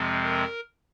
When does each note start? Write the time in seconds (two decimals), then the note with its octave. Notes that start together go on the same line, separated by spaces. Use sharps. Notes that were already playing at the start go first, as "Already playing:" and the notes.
Already playing: F2 C3 F3 G#3 C4
0.23 A#4